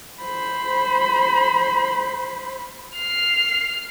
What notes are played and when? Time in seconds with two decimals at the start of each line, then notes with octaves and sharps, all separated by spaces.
0.23 C5 B5
2.95 F6 C7